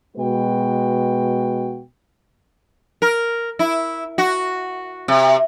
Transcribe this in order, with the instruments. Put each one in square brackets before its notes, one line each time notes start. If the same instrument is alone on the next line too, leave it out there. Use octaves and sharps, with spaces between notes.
[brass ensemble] B2 G#3 F#4 B4 G5
[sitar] A#4
E4
F#4
C3